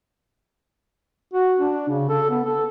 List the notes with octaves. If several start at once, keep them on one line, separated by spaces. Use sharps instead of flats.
F#4
D4
C#3
A4
B3
A4